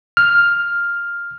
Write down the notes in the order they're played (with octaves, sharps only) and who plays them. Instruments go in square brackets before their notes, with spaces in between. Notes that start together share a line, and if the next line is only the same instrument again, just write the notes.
[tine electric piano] F6